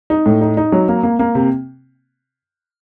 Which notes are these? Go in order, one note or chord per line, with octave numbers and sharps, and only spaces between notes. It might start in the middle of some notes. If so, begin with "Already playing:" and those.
D#4
A2
D#4
D#4
F#3
A#3
A#3
A#3
C3